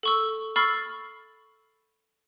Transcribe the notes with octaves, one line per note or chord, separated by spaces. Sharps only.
A4 C#6 E6
B5 C#6 E6 F6 A6 C7